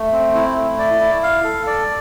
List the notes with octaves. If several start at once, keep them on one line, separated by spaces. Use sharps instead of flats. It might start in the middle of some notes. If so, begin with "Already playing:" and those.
Already playing: A3
C4
E4
A3
D5
E4
F5
A4
D5